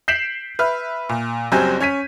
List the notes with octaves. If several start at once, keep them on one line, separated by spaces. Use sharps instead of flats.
G6 B6 C7 D7 E7 F#7
B4 E5 F6
A#2
F#1 F#3 G3 C4 G#5 G6
C#4 G#6 B6 D#7